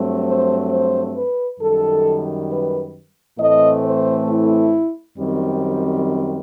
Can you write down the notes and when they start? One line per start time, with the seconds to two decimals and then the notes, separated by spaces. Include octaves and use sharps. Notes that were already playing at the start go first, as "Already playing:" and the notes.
Already playing: G2 F#3 A3 C4
0.25 C5
0.70 C5
1.15 B4
1.60 F#2 D#3 G3 A4
2.50 B4
3.38 A2 E3 A3 C4 D#5
3.82 C5
4.27 E4
5.18 F#2 D#3 G3 C4